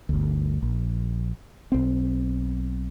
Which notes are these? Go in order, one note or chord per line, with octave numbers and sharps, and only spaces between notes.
G1 D2
A#1
B1 C4